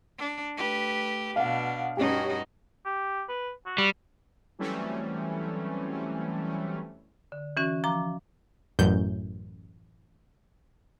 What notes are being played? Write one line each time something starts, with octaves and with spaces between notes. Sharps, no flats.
D4
A3 G4 B4
B2 D4 F5 F#5
G2 C#4 D#4 F#4 G4
G4
B4
F#4
G3
E3 F#3 G3 A3 C4 C#4
D3
E3 C#4 F#4
F3 A#5 D6
A1 F#2 G6